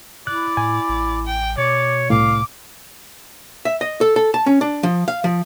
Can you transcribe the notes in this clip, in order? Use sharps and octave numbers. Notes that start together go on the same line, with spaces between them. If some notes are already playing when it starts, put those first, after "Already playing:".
E4 D5 F#6
A2 G#5
A1
G5
B2 C#5 D5
C2 A2 F5 D6
E5
D#5
A4
A4
A5
C#4
D4
F3
F5
F3